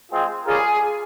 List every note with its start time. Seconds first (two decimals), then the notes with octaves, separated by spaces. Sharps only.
0.11 G#3 C4 F4 G#4
0.46 G3 C#4 F4 G#4 A#4 G#5